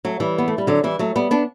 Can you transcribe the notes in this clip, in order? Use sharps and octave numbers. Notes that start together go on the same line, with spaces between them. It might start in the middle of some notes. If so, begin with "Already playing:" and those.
F#3 A3
E3 G3
B3
A3
G3
D3 F#3
E3 G3
F#3 A3
G3 B3
B3 D4